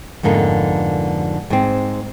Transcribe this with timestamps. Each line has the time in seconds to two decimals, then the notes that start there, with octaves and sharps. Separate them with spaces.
0.23 F2 G#2 D3 A#3 B3
1.50 G#2 C4